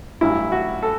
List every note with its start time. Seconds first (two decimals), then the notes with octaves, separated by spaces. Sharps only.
0.21 A1 G2 F#3 E4
0.52 F#4
0.83 A4